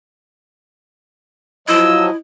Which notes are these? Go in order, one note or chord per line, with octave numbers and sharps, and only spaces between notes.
F3 F#3 E4 D#5 E6